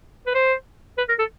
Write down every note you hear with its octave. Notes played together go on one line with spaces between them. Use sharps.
B4
C5
B4
A#4
A4